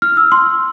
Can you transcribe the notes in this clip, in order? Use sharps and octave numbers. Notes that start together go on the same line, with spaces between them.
F6
E6
C6